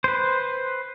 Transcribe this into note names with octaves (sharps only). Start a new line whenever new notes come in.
B4 C5